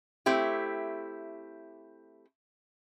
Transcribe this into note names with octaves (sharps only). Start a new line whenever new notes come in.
A3 C4 E4 G4